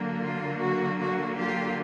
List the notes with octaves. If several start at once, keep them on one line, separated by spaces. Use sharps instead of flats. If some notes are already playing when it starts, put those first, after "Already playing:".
Already playing: D3 F#3 A#3
F4
F#4
F#4
F4 G4